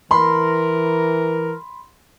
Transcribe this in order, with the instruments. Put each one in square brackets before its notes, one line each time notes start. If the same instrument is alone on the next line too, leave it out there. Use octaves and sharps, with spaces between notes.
[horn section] E3 A#4 [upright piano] B5 C6